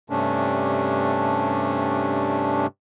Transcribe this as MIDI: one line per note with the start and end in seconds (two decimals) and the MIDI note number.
0.10 2.67 43
0.10 2.67 48
0.10 2.67 57
0.10 2.67 61
0.10 2.67 62